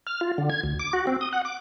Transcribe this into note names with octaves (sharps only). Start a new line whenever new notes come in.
F6
F4
D3
G#6
D2
D6
F#4
C4
D#6
F#5
D6